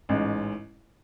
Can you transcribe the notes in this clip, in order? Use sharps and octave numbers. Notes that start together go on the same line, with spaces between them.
A1 G#2 G#3 C#4